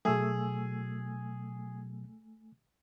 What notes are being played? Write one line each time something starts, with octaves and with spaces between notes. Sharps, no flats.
B2 F#3 A3 G#4 G#5 E6